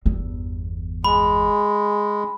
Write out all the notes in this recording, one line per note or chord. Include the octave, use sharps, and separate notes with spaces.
G1 E2
G#3 B5